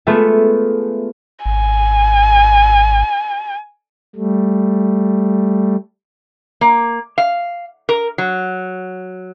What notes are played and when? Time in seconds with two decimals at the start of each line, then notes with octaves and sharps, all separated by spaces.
0.07 G#3 A3 B3 F4 E5
1.46 G#1 G#5
4.16 G3 A3
6.61 A#3
7.18 F5
7.89 A#4
8.18 F#3